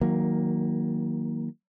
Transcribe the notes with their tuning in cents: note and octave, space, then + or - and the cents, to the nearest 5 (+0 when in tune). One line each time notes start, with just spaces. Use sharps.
D#3 +30 F#3 +0 A#3 +0